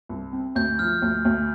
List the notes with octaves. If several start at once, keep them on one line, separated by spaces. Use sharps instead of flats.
C2
C4
D2 G6
F3 F6
D2
D2